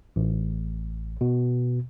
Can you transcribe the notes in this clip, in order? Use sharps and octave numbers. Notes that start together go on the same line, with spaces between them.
A1
B2